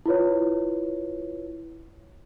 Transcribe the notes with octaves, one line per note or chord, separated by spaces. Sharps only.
E4 F4 B4 C#5